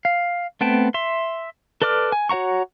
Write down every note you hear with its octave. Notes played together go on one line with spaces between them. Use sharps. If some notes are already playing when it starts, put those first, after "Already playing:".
F5
A3 B3 C4 G5 A5
E5 C6
A4 B4 D5 D6 F6
G#5
F#4 C#5 F#5 A#5 C#6